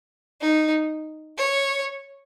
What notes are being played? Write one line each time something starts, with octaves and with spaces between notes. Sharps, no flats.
D#4
C#5